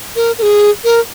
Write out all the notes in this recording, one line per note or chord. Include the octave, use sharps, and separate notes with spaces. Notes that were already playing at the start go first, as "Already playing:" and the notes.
A#4
A#4
G#4
A#4